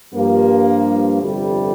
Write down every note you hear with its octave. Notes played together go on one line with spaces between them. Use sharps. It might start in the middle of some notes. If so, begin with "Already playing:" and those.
G2 F3 A#3
G1 F2 C3 G3